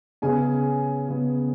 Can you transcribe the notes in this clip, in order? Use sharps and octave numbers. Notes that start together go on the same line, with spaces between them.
C#3 B3 G#4 G#5
C#3 B3